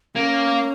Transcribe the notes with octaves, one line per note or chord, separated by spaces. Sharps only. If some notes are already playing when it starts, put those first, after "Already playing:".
A#3 C#4